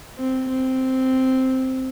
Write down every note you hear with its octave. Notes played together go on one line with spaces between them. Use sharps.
C4
C4